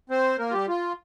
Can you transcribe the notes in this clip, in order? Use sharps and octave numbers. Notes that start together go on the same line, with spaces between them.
C4 C5
A#3 A#4
F4
G3 G4
F4